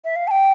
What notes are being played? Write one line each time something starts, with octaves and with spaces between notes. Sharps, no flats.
E5
F5
A5
G5